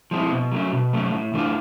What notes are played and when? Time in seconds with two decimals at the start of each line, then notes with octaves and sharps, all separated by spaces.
0.11 F3 G#3 C4 E4
0.31 B2
0.51 F#3 A3 C#4
0.72 B2
0.93 F#3 A3 C#4
1.13 A2
1.34 E3 A3 D4 F4